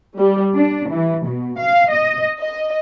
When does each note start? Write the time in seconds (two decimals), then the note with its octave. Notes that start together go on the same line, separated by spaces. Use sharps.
0.17 G3
0.54 D4
0.89 E3
1.27 B2
1.59 F5
1.91 D#5
2.39 D#5